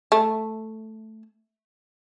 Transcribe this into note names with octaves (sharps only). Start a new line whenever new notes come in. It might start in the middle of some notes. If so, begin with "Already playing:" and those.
A3